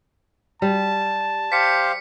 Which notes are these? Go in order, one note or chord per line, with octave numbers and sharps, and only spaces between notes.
G3 A5
G4 C5 F5 B6 C#7